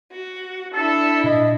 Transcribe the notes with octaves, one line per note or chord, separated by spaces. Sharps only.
F#4
D4 E4 A4
A#2 D#5